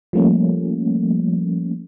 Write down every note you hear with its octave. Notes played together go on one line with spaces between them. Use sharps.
F3 G3 A3 A#3 C#4